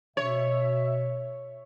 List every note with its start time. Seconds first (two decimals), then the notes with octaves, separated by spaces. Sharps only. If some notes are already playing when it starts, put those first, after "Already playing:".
0.17 B2 C#5 E5